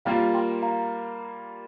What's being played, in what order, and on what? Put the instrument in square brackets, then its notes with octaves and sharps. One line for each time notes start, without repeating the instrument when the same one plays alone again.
[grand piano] G3 A#3 F4 A#4 [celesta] F5 A#5
[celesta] G5 C6
F5 A#5